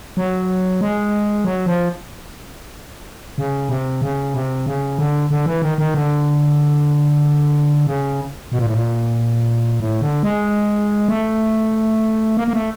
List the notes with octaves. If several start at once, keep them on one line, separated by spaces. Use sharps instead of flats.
F#3
G#3
F#3
F3
C#3
C3
C#3
C3
C#3
D3
D3
E3
D#3
D#3
D3
C#3
B2
A#2
A2
A#2
A2
D3
G#3
A3
A#3
A#3
A3